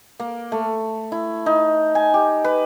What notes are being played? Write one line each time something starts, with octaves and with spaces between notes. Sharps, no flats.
A#3
A3
E4
D#4
G#5
G4
B4